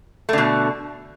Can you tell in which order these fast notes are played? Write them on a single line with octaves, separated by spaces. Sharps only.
A3 D3 B2